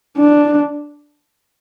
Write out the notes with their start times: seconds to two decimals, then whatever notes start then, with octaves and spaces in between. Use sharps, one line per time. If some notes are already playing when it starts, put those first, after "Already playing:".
0.18 D4